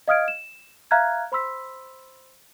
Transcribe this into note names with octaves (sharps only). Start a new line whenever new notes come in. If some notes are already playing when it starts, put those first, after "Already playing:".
D#5 F5 D#6 F6 G#6 D7
E7
E5 F5 A#5 F6 F#6 G#6
C5 B5 C6 E6 B6